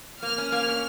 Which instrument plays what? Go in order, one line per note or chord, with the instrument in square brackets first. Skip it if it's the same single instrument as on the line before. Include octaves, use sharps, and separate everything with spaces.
[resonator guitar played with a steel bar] A#3 [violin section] F6
[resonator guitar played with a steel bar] C#4
[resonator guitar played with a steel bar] A#3 [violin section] F6
[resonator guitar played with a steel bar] C#4